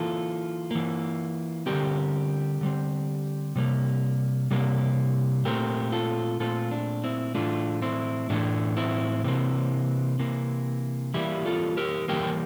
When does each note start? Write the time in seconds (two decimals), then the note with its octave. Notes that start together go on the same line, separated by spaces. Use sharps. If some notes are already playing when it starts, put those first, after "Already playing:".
Already playing: E3 A#3 F4 A4
0.71 E3 A#3
1.66 D3 G3 C4 G4 A#4
2.61 D3 G3 C4
3.56 C3 G3 A#3
4.51 C3 G3 A#3
5.45 A#2 A3 C4 G4 A#4
5.92 F4 A4
6.40 A#2 A3 C4 F4 A4
6.71 D4
7.04 C4 E4
7.35 A2 E3 A3 D4 F4
7.82 C4 E4
8.30 A2 E3 A3 D4
8.77 C4 E4
9.24 C3 E3 A#3 C4
10.19 C3 E3 A#3
11.14 E3 G3 A#3 E4 G4
11.46 F4 A4
11.77 G4 A#4
12.08 E3 G3 A#3 G4 A#4